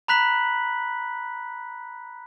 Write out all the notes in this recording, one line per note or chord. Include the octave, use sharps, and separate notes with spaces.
A#5 B5 F#6 B6 F#7